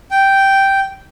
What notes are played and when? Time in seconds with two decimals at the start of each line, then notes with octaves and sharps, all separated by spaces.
0.11 G5